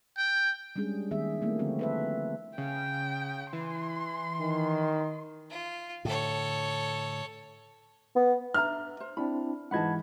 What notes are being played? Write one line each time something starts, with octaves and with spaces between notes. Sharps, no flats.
G5
G3 G#3 C#4 D4 G#4
D#3 A#3 B3 G#4 E5
A3 A#3 C4 E4
D3 F3 B3 C4 F#4
A4 B4 E5
C#3 G5
E3 C6
D#3
F4
A2 D3 A4 C#5
B3
D4 E5 A#5 F6
C5
C4 D4 E4 B5
G#2 E3 B4 D#5 F#5 A5 B5 G#6